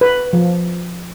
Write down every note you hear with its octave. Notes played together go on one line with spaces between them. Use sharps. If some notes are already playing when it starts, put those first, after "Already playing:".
B4
F3